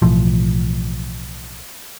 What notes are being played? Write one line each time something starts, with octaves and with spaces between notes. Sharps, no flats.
B1 A2 E3 F3